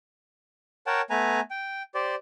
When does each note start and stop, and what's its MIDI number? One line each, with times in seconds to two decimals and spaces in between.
0.87 1.01 70
0.87 1.01 73
0.87 1.01 78
0.87 1.01 79
0.87 1.01 81
1.10 1.40 57
1.10 1.40 59
1.10 1.40 71
1.10 1.40 80
1.10 1.40 82
1.51 1.82 79
1.95 2.15 67
1.95 2.15 72
1.95 2.15 74